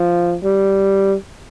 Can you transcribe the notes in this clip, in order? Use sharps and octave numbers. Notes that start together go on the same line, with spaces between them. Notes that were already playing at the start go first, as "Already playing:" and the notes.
Already playing: F3
G3